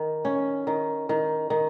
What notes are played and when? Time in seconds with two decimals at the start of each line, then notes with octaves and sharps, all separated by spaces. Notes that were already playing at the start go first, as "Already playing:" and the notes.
Already playing: D#3
0.25 C#4
0.67 D#3
1.09 D#3
1.50 D#3